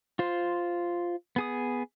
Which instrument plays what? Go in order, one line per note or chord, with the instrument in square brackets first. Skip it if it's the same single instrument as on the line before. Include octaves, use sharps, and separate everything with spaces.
[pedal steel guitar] F4 C5
B3 G#4 D#6